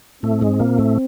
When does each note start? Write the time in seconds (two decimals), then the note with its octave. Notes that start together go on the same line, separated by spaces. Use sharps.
0.23 A2 A3 C4
0.41 G#2 G#3
0.60 A#2 A#3
0.78 A2 A3